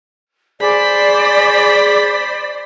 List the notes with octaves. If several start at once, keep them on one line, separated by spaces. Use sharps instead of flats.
G#4 C5 D5 B5